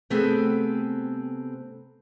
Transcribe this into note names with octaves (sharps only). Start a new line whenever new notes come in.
C3 A3 B3 C4 G#4 A4